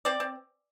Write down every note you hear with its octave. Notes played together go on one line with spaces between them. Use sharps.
C4 D5
C4